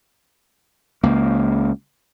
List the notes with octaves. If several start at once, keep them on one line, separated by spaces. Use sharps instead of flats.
C#2 A#3